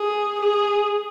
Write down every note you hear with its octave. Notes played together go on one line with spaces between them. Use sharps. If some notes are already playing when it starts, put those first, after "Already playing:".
Already playing: G#4
G#4